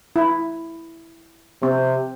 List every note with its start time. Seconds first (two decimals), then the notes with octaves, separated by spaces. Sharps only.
0.16 E4
1.62 C3 C4